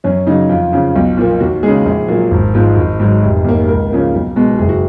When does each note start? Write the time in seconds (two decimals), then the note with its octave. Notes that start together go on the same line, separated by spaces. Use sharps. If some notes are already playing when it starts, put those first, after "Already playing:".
0.04 F#2 C#4
0.27 C#3 F#3 D#4
0.49 F2 F4
0.72 C#3 F3
0.96 B1
1.17 A#2 F3 A#3
1.40 D#2 F#4
1.63 C#3 G#3 G#4
1.86 A#1
2.08 A#2 F#3 A#3
2.31 G#1
2.54 G#2 F3 G#3
2.77 G#1
3.00 G#2 F#3
3.23 F1
3.44 D#2 D#3 A#3
3.68 C#2 A#4
3.91 C#3 F3 A#3
4.14 B1
4.36 B2 G#3
4.59 F#1 G#4
4.69 F#4